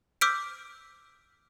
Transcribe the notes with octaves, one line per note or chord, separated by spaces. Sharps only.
D6 E6 F6 G6 B6 D7